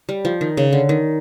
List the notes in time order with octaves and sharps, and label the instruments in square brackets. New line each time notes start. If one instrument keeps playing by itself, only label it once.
[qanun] G3
F3
D#3
C#3
D3
D#3